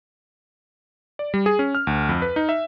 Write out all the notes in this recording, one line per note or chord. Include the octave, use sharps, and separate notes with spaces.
D5
G3
G#4
C#4
F6
D2
F2
B4
D#4
E5